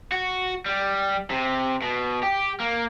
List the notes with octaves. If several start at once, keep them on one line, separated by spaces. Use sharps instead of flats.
F#4
G3
C3
B2
G4
A#3